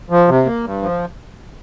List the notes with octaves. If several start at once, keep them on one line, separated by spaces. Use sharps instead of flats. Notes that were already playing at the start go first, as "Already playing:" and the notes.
F3
C3
A#3
G2
F3